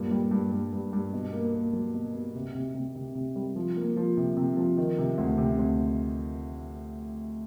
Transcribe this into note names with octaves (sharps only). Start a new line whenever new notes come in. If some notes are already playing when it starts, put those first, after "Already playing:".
Already playing: G2 A#2
G3
G2
G2
G2
G2
B2
A#3
A#3
F#3
B2
B2
C3
C3
C3
C3
C3
G3
F3
A#3
F3
C3
C3
F3
D#3
C3
D2
C3
D2